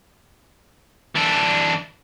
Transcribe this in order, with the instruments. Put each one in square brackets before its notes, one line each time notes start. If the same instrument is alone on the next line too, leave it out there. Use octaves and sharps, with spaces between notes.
[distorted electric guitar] E3 D4